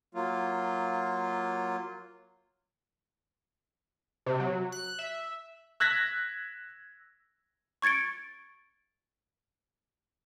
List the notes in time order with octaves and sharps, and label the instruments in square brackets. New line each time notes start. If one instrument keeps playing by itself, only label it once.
[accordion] F#3 A#3 F4
[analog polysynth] C3
F#3
F#6
E5
[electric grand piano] E6 F#6 G#6 A#6 B6
[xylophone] C#6 G#6 A6 C#7 D7